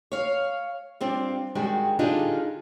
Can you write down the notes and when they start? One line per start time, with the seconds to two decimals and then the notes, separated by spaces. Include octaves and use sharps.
0.12 C#5 F5
1.01 G3 C4 D4 F4
1.55 G2 D#3 G3 G#3 F#4
1.99 D3 G3 D4 D#4 F4 G#4